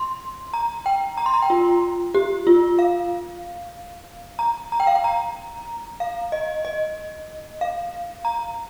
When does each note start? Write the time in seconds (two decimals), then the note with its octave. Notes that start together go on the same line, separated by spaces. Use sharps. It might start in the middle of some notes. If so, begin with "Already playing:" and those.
Already playing: C6
0.54 A#5
0.86 G5
1.17 A#5
1.26 C6
1.34 A#5
1.42 G5
1.50 F4
2.15 G4
2.47 F4
2.79 F5
4.39 A#5
4.72 A#5
4.80 G5
4.87 F5
4.95 G5
5.04 A#5
6.00 F5
6.32 D#5
6.65 D#5
7.61 F5
8.25 A#5